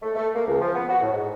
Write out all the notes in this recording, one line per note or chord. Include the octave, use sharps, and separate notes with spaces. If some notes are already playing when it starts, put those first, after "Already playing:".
A3
A3
A#3
C#2
F3
B3
F#4
A2
G#2